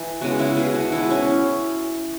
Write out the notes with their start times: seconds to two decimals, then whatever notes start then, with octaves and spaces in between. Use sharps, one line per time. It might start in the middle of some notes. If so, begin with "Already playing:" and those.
Already playing: E3
0.21 C#3 G#3 B3 F#4
0.39 E4
0.57 B2 B3 G#4
0.75 F#4
0.92 E3 G#3 B3 E4
1.11 C#4